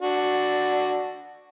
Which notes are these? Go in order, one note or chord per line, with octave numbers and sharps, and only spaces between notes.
D4 F#4